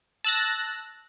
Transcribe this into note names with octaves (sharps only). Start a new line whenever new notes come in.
A5 E6 F#6 A6 A#6